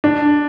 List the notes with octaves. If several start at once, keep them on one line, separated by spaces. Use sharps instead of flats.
D4